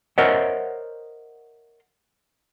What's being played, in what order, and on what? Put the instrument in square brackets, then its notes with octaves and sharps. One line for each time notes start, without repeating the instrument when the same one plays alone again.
[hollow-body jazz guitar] A#4 C5 C#5 D#5 E5 F#5